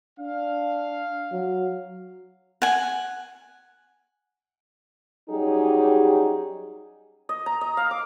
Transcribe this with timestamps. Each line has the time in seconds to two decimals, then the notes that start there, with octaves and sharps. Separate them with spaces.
0.20 D4 F5
1.32 F#3
2.62 F#5 G#5
5.30 F#3 G3 C#4 D#4 G4 G#4
7.29 D#5
7.46 A#5
7.61 D#5
7.77 F5
7.91 D6